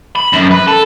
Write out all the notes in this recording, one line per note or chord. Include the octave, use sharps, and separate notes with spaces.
B5
F#2
B4
A4